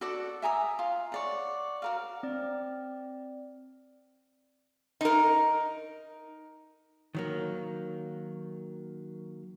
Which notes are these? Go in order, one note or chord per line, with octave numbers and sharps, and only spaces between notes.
F#4 A4 D5 F#5
E5 G#5 A#5 D#6
F4
C#5 D5 F#5
F#4 A#4 F5
C4 D5
D#4 A#4
D#3 F#3 A#3